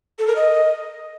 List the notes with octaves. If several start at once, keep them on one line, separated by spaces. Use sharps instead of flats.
A4
A#4
D#5